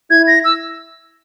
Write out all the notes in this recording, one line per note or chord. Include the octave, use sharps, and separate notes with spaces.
E4 G#6
A#6
E6